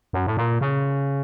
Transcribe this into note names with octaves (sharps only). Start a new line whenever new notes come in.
F#2
A2
A#2
C#3